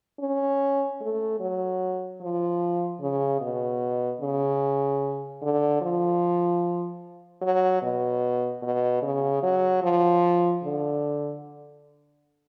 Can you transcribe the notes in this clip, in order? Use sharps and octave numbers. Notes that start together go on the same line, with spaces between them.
C#4
A3
F#3
F3
C#3
B2
C#3
D3
F3
F#3
B2
B2
C#3
F#3
F3
D3